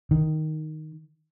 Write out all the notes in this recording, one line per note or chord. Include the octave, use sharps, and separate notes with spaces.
D#3